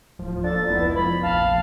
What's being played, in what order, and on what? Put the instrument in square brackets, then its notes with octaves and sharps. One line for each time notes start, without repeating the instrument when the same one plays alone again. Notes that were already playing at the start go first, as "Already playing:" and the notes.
[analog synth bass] D1 [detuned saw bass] F3
[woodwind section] A#3 A4 [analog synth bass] D4 [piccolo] A6
[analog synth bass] F1 [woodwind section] C#2 E4 [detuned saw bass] B3
[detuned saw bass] F3 [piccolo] B5
[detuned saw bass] A#1 [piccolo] F5 [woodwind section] A5